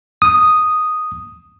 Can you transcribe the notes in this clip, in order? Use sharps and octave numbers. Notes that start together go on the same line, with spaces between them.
D#6